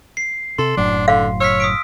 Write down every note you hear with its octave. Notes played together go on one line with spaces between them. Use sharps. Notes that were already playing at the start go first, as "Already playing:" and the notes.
C7
C3 A4 C6
F#1 A2 F#3 D4
D3 F5
C#5 E6 F6 B6
D#6 B6 D7